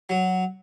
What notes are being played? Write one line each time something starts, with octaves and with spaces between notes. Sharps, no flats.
F#3